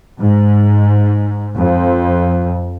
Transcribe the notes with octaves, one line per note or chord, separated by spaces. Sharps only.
G#2
F2